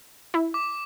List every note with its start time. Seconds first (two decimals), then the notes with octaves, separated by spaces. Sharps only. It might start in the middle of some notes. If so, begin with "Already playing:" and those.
0.34 E4
0.54 D6